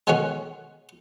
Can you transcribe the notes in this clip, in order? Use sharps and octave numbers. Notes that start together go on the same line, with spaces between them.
B2 D#3 F#3 G#3 C#4 F#4